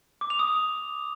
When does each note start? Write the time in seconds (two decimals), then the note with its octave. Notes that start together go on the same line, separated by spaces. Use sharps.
0.21 D6
0.30 F7
0.39 D#6